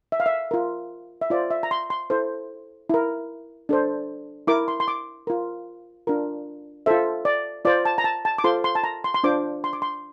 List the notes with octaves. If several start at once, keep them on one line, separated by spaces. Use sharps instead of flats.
E5
F5
E5
F4 A#4
E5
F4 C5 D5
E5
A#5
C6
C6
E4 A4 C5
E4 A#4
D4 A4 C5
E4 A#4 D6
C6
C6
D6
F4 A#4
D4 F4 A#4
F4 A4 C5 E5
D5
F4 C5 D5
A5
A#5
A5
A5
D6
F4 A4 C5 C6
C6
A5
A#5
C6
C6
D4 F4 C5 D6
C6
D6
C6